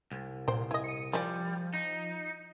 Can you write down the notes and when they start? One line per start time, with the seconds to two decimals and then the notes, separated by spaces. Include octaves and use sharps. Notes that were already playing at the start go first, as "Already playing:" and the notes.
0.11 C2
0.48 A#2 C5 G5
0.71 E4 D#5 G#5
0.84 C#7 D#7
1.13 F3 G3 D5 E5 G#5
1.74 D#4